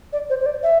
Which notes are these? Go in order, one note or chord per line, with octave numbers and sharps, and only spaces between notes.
D5
C5
C5
D5
E5